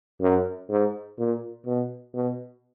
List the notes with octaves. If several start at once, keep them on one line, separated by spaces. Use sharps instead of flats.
F#2
G#2
A#2
B2
B2